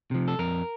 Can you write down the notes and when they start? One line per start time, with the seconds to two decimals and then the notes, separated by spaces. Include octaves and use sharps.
0.11 C3 F3
0.28 A4
0.39 F2 A#4